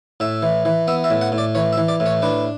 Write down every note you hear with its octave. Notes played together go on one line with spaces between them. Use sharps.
A2 E5
E3
E3
B3 E5
E5
A2
F#5
A2
D5
E3 C#5
E5
E3
D5
A2
C#5
D4 B4